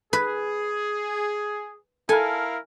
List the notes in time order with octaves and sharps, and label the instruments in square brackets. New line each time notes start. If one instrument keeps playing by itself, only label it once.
[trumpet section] G#4 [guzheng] B4
[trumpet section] E4 A#4 F5 [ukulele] A4 [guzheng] G#5